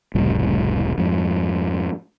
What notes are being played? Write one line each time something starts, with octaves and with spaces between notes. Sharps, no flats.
F1 C#2 A2 G3
F2 G#2